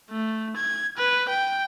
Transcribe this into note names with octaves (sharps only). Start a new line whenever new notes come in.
A3
G#6
B4
G5